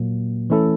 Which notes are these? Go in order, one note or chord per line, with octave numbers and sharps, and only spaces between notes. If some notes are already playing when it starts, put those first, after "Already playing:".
Already playing: A#2 F#3 A#3
E3 A3 C#4 E4 A4